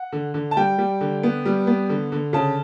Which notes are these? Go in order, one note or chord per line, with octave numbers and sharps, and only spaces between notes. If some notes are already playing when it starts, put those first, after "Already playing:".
Already playing: F#5
D3
D3
A5
G3 G5
G3
D3
B3
G3
B3
D3
D3
C#3 A5